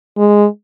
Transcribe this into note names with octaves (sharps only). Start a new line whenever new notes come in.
G#3